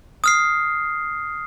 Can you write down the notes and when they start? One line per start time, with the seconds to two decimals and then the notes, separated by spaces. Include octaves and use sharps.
0.24 D#6 F6 C7